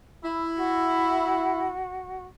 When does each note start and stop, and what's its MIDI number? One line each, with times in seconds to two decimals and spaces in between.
0.24 1.72 64
0.56 2.24 66